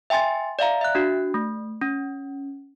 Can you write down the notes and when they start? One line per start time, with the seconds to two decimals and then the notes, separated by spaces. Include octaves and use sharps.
0.10 E5 G5 G#5 C6 A6
0.59 D5 E5 F5 A#5
0.81 E5 F#6
0.95 D4 F#4
1.34 A3
1.81 C#4